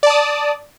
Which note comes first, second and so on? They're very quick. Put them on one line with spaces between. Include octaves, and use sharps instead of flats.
D5 A5 D#6